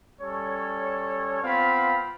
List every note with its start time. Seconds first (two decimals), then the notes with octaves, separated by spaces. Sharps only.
0.20 G3 C#4 A4 C#5
1.43 B3 C4 F4 F5 B5